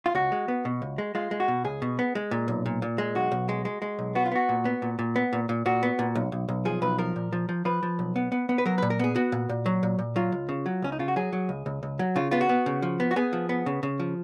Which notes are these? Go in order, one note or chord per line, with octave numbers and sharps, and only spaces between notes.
F4
C#2 F#4
G#3
B3
B2
C#2
G#3
G#3 F4
G#3
F#4
B2
C#2 G#4
B2
B3
G#3
A#2
B1
A#2
A#2
G#3
B1 F#4
B1
G#3
G#3
G#3
B1
B3 F#4
F4
B3 F#4
A#2
B3
A#2
A#2
B3
A#2
A#2
A#2 F#4
B3
A#2
B1
B1
B1
F3 G#4
B1 B4
F3 A#4
A#2
F3
F3
F3 B4
F3
B1
B3
B3
B3
B4
F#3 A#4
A#2 B4
A#4
B3 G#4
B3 F#4
A#2
A#2
F#3
A#2
A#2
F#3 F4
C#2
C#3
F#3
C#2 C#4
D#4
C#3 F4
F#4
F#3 G#4
F#3
C#2
C#2
C#2
F#3
C#3 F4
B3 F4
F#4
B3
C#3
F3
B3
F#4
B3 G#4
F3
B3
C#3
C#3
F3